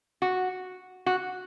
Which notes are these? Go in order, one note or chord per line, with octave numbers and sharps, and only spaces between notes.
F#4
F#4